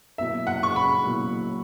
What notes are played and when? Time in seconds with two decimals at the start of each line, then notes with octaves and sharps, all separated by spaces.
0.18 B2 F#3 A#3 E4 E5
0.47 F#5
0.63 C#6
0.76 B5
1.04 B2 F#3 A#3 E4